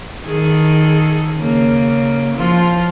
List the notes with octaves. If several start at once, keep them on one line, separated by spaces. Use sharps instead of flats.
D#3 G#4 A4
C#3 A#3
F3 F4